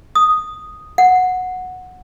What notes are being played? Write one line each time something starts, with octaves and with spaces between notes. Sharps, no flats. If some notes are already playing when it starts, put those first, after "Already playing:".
D#6
F#5